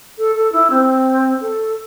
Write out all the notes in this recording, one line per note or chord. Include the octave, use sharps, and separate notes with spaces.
A4
A4
E4
C4
A4